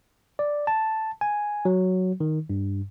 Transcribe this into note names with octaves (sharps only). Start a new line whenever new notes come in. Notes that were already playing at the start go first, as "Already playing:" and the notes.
D5
A5
G#5
F#3
D#3
G2